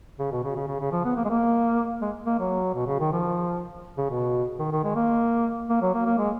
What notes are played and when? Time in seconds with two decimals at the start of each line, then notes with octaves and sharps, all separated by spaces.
0.19 C#3
0.32 B2
0.44 C#3
0.56 C#3
0.67 C#3
0.80 C#3
0.92 F3
1.05 B3
1.16 A#3
1.25 G#3
1.29 A#3
2.02 G#3
2.26 A#3
2.39 F#3
2.74 B2
2.87 C#3
3.00 D#3
3.12 F3
3.98 C#3
4.10 B2
4.59 D#3
4.71 D#3
4.84 G#3
4.95 A#3
5.69 A#3
5.82 F#3
5.94 A#3
6.06 A#3
6.18 G#3